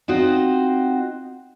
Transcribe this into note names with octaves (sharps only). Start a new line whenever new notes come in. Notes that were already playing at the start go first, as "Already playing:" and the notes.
C4 D#4 F4 F#4 C5